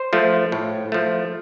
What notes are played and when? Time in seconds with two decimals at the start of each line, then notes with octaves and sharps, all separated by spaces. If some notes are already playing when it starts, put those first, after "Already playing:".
Already playing: C5
0.13 F3 A3
0.52 A2
0.92 F3 A3